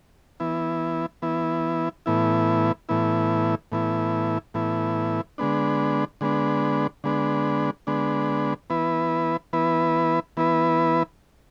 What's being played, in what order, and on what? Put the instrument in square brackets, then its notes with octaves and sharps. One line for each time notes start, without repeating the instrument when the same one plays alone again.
[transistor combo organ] E3 B3 E4
E3 B3 E4
A2 E3 B3 E4
A2 E3 B3 E4
A2 E3 B3 E4
A2 E3 B3 E4
D3 G#3 B3 D4
D3 G#3 B3 D4
D3 G#3 B3 D4
D3 G#3 B3 D4
E3 B3 E4 B4
E3 B3 E4 B4
E3 B3 E4 B4